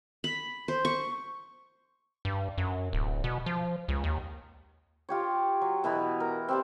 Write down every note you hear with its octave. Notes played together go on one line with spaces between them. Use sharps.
B5
C5
C#6
G2
F#2
D1
B2
F3
C#2
D#2
F4 G4 C#5
F#3
B2 E3 B3
A#4
C4 G4 D5